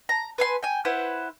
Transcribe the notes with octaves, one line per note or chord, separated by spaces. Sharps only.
A#5
B4 G#5 C6
G5 G#5
E4 B4 C5 F#5